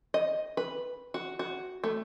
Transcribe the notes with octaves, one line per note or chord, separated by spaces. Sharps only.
D#5
B4
F#4
F#4
A3